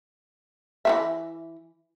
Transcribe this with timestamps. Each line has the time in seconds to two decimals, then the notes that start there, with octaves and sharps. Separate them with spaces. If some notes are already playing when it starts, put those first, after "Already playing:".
0.85 E3 A#3 E5